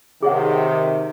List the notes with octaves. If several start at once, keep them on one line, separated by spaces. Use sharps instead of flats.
C3 D#3 G#4 C#5 F#5